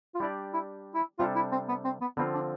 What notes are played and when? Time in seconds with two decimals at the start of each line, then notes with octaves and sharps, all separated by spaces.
0.15 F4
0.20 G3 D4 E4 G4 D5
0.53 E4
0.94 E4
1.19 C3 G3 D4 F4 A4
1.35 E4
1.52 C4
1.69 B3
1.85 C4
2.01 B3
2.17 D3 F3 B3 C4 F4
2.34 D4